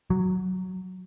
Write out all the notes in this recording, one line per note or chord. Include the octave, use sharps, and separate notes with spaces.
F#3